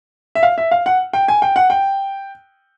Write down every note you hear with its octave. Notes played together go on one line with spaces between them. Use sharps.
E5
F5
E5
F5
F#5
G5
G#5
G5
F#5
G5